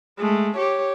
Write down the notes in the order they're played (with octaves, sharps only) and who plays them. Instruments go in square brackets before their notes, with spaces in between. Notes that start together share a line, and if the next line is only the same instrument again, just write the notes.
[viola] G#3 A3
G4 C#5